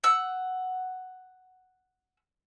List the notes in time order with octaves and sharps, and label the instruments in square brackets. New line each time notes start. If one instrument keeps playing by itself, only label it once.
[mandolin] F#5 E6